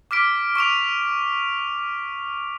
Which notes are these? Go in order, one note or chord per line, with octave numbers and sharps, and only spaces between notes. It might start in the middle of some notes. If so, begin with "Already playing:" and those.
D6 F6 B6 D7
C#6 D6 D7 F7